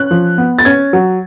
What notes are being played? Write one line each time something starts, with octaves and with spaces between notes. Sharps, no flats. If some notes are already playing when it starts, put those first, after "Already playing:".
Already playing: C#4 F#6
F3
B3
A6
C#4 G#6
F#3